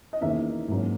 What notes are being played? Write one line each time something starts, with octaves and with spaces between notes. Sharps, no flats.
D#5
E2 D#3 A#3 C#4 E5
G#2 F#3 A#3 C#4